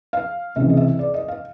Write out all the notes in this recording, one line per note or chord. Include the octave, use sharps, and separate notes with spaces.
F5
C#2 C3 E3 E5
D#5
E5
D5
D#5
F5